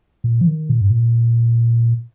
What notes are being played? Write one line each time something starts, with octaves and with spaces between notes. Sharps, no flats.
A#2
F3
D#3
A#2
G2
A#2